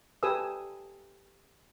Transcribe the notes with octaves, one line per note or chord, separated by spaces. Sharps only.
G4 A4 B4 G#5 D#6 E6